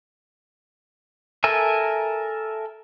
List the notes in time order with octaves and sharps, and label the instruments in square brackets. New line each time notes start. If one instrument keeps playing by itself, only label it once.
[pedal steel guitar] A4 A#4 E5 G#5